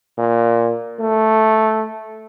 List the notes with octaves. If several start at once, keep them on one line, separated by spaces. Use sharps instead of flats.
A#2
A3